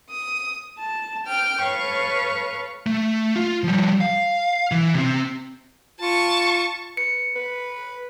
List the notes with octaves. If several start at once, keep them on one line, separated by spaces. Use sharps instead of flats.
D#6
A5
G5 D6 F6
A4 B4 C#5 F5 C#6
A3
F4
F3 G3
F5
E3
C3 C4
F4 A5 C#6
B4 C#7
B4